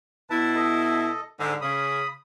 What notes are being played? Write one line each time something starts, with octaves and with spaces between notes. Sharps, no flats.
B2 E4 B4 A5
A4 D#5
G#2 D3 C5 E6
C#3 B5 D#6